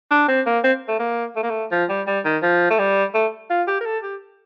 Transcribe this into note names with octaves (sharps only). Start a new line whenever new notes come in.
D4
C4
A#3
C4
A3
A#3
A3
A#3
A3
F3
G3
G3
D#3
F3
A3
G3
A3
F4
G4
A#4
A4
G4